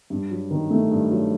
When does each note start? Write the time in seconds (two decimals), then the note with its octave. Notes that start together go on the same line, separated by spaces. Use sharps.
0.10 G2
0.30 F#3
0.51 D#3
0.71 A3
0.91 G2
1.10 F#3